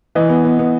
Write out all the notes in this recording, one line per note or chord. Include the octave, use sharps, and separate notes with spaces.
E3 D#5
B3
B3
B3